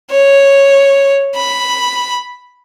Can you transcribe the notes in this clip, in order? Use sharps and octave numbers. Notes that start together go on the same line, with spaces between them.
C#5
B5